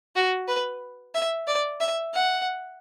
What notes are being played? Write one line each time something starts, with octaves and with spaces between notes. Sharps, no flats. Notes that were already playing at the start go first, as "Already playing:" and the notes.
F#4
B4
E5
D5
E5
F#5